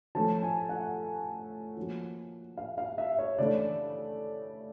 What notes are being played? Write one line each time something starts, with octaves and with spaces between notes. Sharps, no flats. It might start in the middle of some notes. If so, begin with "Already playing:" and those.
F3 A3 C#4 F4 A5
G#5
F#5
F3 A#3 C#4 F#4
F5
F5
E5
C#5
C#3 E3 A3 D4 D5